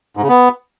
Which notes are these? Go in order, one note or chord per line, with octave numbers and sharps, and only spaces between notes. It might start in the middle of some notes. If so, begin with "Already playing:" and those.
G#2
C#3
B3